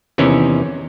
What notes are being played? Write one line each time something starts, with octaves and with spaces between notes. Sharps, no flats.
E2 C3 D#3 E3 C#4